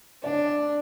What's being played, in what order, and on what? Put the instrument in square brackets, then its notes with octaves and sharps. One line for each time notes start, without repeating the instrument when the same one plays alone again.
[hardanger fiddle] D4 [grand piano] D5